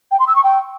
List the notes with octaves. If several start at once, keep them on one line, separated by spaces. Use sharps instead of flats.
G5
C6
E6
C#6
G5